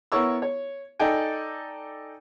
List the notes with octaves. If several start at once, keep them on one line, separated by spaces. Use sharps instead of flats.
B3 E4 A#4 C#5 C#6 E6
C#5
D#4 A4 D5 D#5 G5 G#5